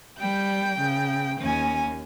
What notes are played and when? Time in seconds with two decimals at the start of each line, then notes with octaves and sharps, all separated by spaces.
0.20 G3 G5 G6
0.79 C#3
1.41 D#2 C#4 G#5